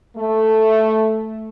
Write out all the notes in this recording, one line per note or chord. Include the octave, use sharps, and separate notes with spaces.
A3